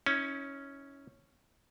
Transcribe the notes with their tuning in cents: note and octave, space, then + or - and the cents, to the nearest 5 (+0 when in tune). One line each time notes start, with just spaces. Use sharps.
C#4 +0 E4 -45